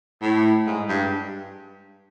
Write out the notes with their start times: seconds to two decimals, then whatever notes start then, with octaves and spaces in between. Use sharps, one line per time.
0.22 A2
0.67 G#2
0.89 G2